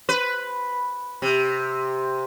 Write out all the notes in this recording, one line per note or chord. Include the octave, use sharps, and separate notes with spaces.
B4
C3